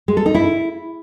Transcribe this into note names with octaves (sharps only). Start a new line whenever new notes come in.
G#3
A4
D#4
E4